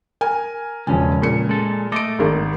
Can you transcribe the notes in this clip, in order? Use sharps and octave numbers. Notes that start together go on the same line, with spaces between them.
A#4 G#5
E1 C#2 F3 C#4 G#5
A#2 C#7
G#3 A4
A3 A4 D#5 D6 D7
G#1 D#3